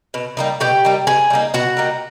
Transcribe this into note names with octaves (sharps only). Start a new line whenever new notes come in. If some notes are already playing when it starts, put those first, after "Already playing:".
B2
G3 A#3 D#4
B2 G4 G5
G3 A#3 D#4
B2 G#4 G#5
G3 A#3 D#4
B2 F#4 F#5
G3 A#3 D#4